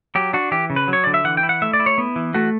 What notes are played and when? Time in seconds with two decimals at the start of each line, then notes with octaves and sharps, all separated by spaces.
0.15 F#3 G4
0.33 D4 F#4
0.52 E3 G4
0.70 C#3
0.76 B4
0.88 F#3
0.93 C#5
1.04 D3 D5
1.14 E5
1.25 E3 F#5
1.37 G5
1.43 E4
1.49 F#5
1.62 A3 E5
1.74 D5
1.80 E4
1.86 C#5
1.98 B3
2.16 E3
2.34 A3 F#4